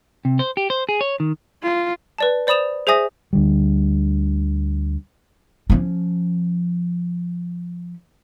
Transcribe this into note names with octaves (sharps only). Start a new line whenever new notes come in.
C3
C5
G4
C5
G#4
C#5
D#3
F4
B4 D5 A5
C5 D5 B5 D#6 E7 F7
G#4 C5 E5 G#5 D#6 A#6
D2 D3 G3
F3 C#4